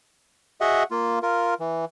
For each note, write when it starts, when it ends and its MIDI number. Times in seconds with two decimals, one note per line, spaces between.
0.61 0.83 66
0.61 0.83 68
0.61 0.83 75
0.61 0.83 76
0.61 0.83 78
0.91 1.19 58
0.91 1.19 65
1.23 1.54 65
1.23 1.54 70
1.60 1.85 52